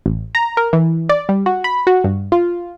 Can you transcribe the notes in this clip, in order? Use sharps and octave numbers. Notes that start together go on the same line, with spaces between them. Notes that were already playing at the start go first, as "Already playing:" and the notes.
A1
A#5
A#4
E3
D5
G3
F#4
B5
F#4
G2
F4